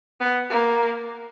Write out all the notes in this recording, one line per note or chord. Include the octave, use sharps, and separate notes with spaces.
B3
A#3